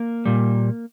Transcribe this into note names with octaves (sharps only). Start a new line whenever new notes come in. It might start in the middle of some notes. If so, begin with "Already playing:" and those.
Already playing: A#3
A#2 G3